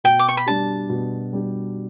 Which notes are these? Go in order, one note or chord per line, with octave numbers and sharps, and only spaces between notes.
B2 G5
D6
C#6
B5
G3 D4 G4 A5
B2
G3 D4 G4